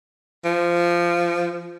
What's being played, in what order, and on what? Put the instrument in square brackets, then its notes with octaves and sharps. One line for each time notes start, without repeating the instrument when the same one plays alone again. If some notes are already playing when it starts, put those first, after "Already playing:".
[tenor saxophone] F3